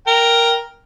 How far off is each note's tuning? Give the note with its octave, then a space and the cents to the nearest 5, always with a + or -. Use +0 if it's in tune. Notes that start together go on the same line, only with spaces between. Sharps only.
A#4 +0 G5 +0